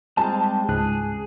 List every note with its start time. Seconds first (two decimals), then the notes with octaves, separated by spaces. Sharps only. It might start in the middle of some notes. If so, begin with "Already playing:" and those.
0.17 G3 G#3 C4 A5
0.69 C#2 G#2 G#4 F#6